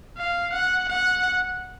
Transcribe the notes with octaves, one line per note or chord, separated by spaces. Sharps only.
F5
F#5
F#5